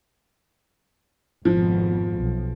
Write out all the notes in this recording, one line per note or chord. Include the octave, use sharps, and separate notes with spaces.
G#1 F2 B2 F3
B1